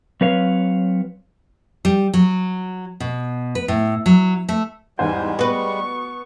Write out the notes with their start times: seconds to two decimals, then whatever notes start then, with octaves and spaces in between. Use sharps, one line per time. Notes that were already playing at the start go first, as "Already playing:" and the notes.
0.21 F#3 C4 B4 C#5 F5
1.85 G3
2.14 F#3
3.00 B2
3.55 B4
3.68 A2
4.06 F#3
4.49 A3
4.99 E2 G#2 G3 G#3 C5 G#5
5.39 B3 F#4 B4 C#6